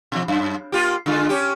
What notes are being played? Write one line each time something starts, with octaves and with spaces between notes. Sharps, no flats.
B2 F3
F#2
A#3 F4 G4
D3 G#3 F4
C#4 G4